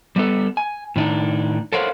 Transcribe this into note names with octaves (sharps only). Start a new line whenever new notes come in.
G3 B3 A4
G#5
A2 D#3 D4 D#4
A4 A#4 C5 C#5 F5 F#5